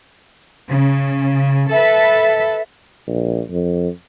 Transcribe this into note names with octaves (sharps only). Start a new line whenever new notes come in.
C#3
A4 B4 E5
A#1
F2